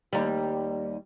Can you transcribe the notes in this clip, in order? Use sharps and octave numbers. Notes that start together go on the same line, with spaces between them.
D#2 G3